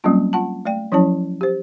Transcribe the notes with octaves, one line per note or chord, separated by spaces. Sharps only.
F#3 G3 A#3 C4 C#4 F4
F4 F#5 A5
A3 D5 G5
F3 F#3 C#4 E4 C#5 A5
G4 C5